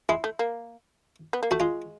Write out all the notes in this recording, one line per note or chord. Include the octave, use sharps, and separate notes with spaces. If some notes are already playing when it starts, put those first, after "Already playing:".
G#3 E4
A3
A#3
B3
A#3
A3 F#4
G#3 F4